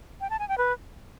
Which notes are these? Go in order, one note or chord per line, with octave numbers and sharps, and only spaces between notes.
G5
A5
G#5
G5
B4